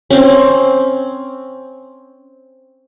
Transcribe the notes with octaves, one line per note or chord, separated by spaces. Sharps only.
C4 C#4